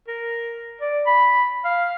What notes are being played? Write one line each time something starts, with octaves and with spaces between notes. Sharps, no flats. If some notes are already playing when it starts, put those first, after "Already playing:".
A#4
D5
B5
F5